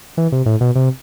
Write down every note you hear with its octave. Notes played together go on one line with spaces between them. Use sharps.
E3
C3
A2
B2
C3